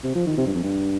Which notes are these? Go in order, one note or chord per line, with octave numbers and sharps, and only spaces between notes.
C3
F3
D#3
C3
G2
F2
G2